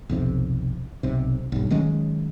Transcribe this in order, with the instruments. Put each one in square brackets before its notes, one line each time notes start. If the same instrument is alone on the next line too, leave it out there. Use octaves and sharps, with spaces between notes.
[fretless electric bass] B1 F2 C3
B1 C3
B1 G2
D#3 F#3 G#3 C#4